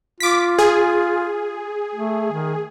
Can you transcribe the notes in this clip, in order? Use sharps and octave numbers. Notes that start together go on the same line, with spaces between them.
F4 D6 B6
G#4
A3
D#3